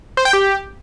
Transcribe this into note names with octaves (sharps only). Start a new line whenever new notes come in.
C5
G5
G4